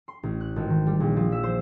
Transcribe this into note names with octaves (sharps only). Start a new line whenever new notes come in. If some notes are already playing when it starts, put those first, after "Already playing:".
C6
A1
F#6
G#1
D#3
G3
A#1
F3
E5
C5